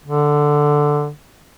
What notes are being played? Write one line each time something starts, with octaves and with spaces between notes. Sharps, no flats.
D3